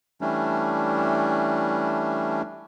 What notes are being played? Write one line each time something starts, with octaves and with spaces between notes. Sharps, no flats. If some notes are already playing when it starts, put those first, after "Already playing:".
E3 G3 A3 C#4 D4